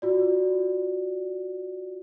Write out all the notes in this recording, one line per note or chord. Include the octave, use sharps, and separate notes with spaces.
F4 F#4 D5